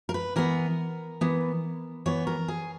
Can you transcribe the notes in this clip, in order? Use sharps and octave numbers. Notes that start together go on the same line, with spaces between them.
A#4
B4
E3 B3 A#4
E3 B3
E3 B3 C#5
A#4
G#4